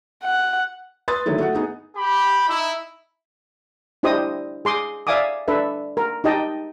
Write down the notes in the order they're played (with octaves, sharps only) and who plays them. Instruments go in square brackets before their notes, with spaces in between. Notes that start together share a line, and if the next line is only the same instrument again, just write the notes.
[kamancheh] F#5
[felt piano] B4 C6 D#6 A6
D3 D#3 F#3 A3 E4
A3 F#4 F#5
B3 D#4 G#4
[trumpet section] G4 G5 B5
D#4 E4
[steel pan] D4 E4 G4 C5 D#5 D#6
G#4 C6 D6 D#6
D5 E5 F5 G#5 D6 D#6
D4 A4 B4 E5
A#4
D#4 G4 D#5 G5 A5